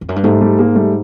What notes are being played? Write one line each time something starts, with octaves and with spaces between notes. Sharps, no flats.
F2
F#2
G2
G#2 G3 A3
G3 A3
G#3 A#3
G3 A3